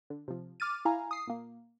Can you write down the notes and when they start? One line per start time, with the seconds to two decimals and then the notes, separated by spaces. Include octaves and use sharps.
0.10 D3
0.28 C3 F3
0.60 D6 F6 A6 D#7
0.85 E4 F5 G#5 A#5
1.11 D#6 C7
1.27 A#2 A#3